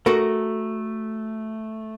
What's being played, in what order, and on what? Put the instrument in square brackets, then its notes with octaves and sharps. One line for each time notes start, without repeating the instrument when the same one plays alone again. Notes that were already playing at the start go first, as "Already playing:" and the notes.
[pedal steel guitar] A3 [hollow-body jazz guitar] F#4 A4 A#4